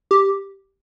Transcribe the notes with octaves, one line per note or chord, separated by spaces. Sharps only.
G4